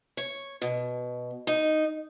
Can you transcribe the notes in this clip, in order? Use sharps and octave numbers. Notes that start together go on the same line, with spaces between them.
C#5
B2
D#4